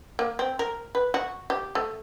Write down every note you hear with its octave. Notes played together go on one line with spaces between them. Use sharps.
A#3
C4
A#4
B4
F#4
G4
A3